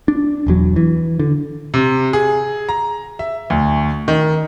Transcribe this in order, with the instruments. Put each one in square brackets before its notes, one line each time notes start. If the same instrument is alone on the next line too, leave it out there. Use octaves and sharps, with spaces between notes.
[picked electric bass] D4
E1 E2 F#3
E3
D3
[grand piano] C3
G#4
A#5
E5
D2
D#3